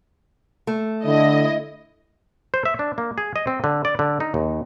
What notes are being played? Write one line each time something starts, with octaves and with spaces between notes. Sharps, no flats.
A3
D3 E4 D#5
C5
E5
D4
A#3
G#4
D#5
C4
D3
D5
D3
D#4
D#2